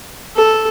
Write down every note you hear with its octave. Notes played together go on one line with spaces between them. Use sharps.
A4